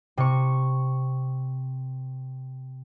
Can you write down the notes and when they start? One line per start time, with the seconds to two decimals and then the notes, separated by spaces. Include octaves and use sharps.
0.17 C3 C#6